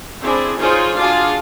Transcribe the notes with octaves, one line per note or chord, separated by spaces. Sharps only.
C4 D4 E4 G#4
D#4 F4 G#4 C5 C#5
D4 F4 F#4 G#4 F5 A5